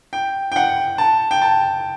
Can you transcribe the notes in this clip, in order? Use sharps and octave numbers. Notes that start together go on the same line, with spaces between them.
G5
G5
F#5
A5
G5
A5